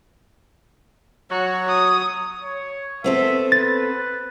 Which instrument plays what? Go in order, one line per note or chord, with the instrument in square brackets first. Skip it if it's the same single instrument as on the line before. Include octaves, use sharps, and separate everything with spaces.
[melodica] F#3 C#5 [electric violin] F#4
[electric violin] D#6
[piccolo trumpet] C#5
[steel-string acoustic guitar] B3 C4 A4 [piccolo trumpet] E5
[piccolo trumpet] B4 [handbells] A6